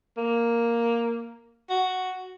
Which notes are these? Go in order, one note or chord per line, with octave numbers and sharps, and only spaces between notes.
A#3
F#4